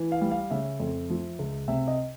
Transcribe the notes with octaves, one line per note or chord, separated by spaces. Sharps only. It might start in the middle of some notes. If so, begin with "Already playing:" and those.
Already playing: E3
F5
G3
F5
C#3 E5
F2
F3
C#2
C3 E5
D#5